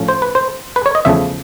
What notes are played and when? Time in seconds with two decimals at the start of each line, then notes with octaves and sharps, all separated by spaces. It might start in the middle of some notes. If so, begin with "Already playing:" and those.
Already playing: A2 F3 A3 C#4
0.08 C5
0.22 B4
0.35 C5
0.76 B4
0.86 C#5
0.95 D#5
1.05 E2 C#3 F3 A3 E5